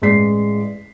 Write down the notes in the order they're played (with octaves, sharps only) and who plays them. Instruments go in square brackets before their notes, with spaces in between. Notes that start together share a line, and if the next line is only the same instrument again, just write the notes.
[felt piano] A1 G#3 D5 B6 C7